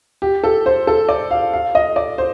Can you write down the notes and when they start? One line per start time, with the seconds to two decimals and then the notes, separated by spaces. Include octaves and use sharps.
0.22 G4
0.44 A4
0.66 C5
0.87 A4
1.08 D5
1.31 F5
1.53 F5
1.75 D#5
1.96 D5
2.18 C5